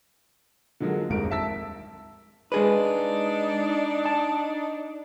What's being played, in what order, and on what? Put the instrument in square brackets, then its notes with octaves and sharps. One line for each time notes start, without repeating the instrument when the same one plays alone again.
[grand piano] D3 F3 F#3 G#3 A#3
D#1 G#1 F2 G#2 A#4 D7
E5 A5 E6 B6
[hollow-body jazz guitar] G#3 G#4 B4 [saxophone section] D4 D#4
[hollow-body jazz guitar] A5